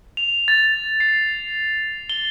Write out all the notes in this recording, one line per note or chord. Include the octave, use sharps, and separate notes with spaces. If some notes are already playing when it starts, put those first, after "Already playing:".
F7
A6
C7
G7